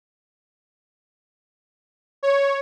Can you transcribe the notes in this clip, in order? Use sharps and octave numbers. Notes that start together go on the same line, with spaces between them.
C#5